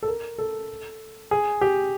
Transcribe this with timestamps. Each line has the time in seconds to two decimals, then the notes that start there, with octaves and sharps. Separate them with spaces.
0.03 A4
0.08 A#4
0.38 A4
1.31 G#4
1.61 G4